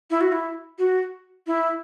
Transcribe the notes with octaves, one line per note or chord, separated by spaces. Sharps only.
E4
F#4
E4
F#4
E4